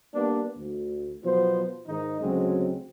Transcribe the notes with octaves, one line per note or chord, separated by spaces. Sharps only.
G3 A#3 B3 D4
D2
B2 F3 F#3 B3 C5
G#2 D#3 D#4
D2 C#3 F#3 G#3 C4